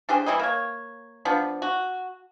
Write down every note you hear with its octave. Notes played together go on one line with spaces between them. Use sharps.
D4 G4 G#4 C5
E3 G3 E4 D#5
A#3 C#5
F3 B3 D4
F#4